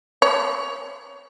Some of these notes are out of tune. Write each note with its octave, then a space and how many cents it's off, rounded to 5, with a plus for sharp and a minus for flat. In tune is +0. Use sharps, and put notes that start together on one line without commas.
C#5 +20